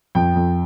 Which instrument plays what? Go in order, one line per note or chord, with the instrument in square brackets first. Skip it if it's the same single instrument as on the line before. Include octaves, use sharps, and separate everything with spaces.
[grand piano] F2 G5
F2